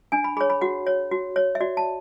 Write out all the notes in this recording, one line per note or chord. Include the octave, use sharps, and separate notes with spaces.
D4 G#5
B5
G#4 C#5 B5
B5
F#4 F#5
C#5
F#4
C#5
E5
F#4 D5
A5